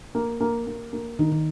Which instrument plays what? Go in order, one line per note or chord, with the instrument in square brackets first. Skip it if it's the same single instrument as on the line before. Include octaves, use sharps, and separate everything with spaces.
[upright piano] A#3
A#3
A#3
A#3
[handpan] D#3 [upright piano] D#4
[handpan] D#3